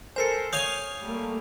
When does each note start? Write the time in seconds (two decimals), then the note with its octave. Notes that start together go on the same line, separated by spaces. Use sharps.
0.16 A4 A#4 C5 G#5 C7 C#7
0.53 C#5 F5 G#5 D#6 G6
1.02 G3 A3 A#3